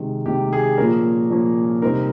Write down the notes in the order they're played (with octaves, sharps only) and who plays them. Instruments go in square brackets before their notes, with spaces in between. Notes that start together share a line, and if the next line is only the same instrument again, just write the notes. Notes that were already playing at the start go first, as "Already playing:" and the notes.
Already playing: [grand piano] C3 D#3 G#3
C3 D#3 G#3 G4
G#4
A#2 F3 A#3 C#4 A#4
A#2 F3 A#3 C#4
C3 G3 C4 D#4 A#4